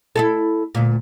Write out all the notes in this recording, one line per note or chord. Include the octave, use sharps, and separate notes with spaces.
E4 F4 A4
D2 A#2